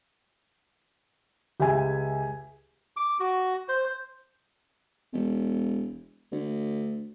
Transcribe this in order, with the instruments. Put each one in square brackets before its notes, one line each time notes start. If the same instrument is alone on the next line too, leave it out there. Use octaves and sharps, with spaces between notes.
[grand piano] C#2 [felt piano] G4 E5 G#5
[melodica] D6
F#4
C5
[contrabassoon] E1
D2